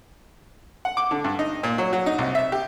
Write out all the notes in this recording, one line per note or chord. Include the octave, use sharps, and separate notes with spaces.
F#5
D6
D3
G2
D#4
A#2
F#3
F#3
D#4
C2
E5
G4